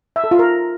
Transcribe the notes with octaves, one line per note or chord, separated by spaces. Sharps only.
E5
A4
F4
A#4